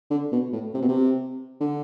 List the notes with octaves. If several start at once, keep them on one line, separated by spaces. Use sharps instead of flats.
D3
B2
A2
C3
B2
C3
D3